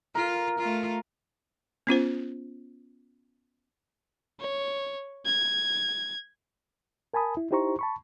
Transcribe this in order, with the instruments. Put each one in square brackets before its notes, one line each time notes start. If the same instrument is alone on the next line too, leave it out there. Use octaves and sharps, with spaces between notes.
[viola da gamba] F4 [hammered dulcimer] A#4
[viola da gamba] A3 F4
[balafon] B3 C#4 F4 C5
[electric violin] C#5
G#6
[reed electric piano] A#4 G#5 A5 B5 D#6
E4
D#4 E4 G4 C5 A#5 C#6
A5 B5 C#6